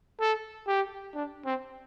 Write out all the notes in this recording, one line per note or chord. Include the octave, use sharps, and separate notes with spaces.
A4
G4
D4
C4